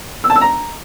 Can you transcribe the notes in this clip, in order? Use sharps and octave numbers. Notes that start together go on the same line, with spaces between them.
E6
A5
E6
A#5